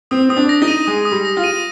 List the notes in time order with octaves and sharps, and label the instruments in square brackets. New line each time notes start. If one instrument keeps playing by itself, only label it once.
[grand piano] C4 [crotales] D#6
[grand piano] C4 [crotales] D#6
[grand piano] D4
[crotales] A#6
[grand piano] D#4
[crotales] D#7
[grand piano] G#3 [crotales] D#6
[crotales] D#6
[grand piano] G3
[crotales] A#6
[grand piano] F4
[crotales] D#7